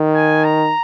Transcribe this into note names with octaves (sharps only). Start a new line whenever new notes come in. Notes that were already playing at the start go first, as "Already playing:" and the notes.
Already playing: D#3
G#5
A#5